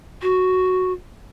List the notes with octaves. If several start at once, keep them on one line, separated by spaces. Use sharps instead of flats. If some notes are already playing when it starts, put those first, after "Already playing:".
F#4